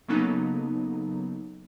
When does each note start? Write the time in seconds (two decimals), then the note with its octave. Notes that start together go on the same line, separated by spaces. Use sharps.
0.08 C#3 F#3 A#3 B3 D#4 A4